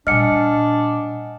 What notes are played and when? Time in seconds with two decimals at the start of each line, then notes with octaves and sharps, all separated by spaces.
0.07 A#2 G3 D4 D#5 F#5 G#5 F6 C#7